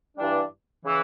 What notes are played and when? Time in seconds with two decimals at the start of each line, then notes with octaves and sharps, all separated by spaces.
0.16 G2 E3 G3 D4
0.85 C#3 E3